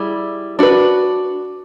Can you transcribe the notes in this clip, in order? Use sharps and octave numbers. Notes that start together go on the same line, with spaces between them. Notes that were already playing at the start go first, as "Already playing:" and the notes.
Already playing: G3 E4 G#4
D4 F#4 B4